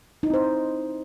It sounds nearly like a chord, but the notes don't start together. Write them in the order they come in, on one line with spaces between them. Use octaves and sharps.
D#4 E4 C4 C5